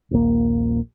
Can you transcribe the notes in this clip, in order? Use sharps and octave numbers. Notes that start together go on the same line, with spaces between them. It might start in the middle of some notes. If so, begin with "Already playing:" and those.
D#1 A#1 A#3